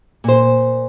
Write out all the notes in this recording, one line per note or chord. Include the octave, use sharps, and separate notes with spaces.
A#2 C5